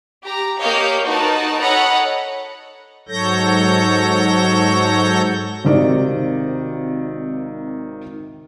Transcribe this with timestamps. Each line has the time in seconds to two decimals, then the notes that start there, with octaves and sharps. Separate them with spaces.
0.24 G4 A#5
0.60 A#3 G4 C#5 D#5 F5 G6
1.04 D#4 F#4 A#4 B4 A5
1.60 A4 C#5 D#5 F#5 A#5 B5
3.09 G#2 F#3 A4 C#5 G6 A#6
5.65 G#1 C3 D#3 D5